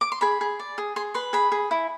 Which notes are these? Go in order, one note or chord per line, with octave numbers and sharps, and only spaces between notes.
D6
C6
G#4 B5
G#4
D5
G#4
G#4 C6
B4 C6
G#4 B5
G#4
E4